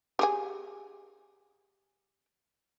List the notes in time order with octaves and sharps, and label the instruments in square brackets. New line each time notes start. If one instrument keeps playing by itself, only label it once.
[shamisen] G4 G#4 G#5